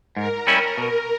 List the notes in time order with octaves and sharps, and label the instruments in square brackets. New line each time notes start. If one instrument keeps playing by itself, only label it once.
[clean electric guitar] G#2 [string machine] A#4
[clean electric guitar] G3 C#4 E4
B2